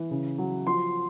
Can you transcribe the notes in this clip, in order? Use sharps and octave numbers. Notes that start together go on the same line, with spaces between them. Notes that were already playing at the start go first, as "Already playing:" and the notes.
Already playing: E3
C#3
F#3
F3 C6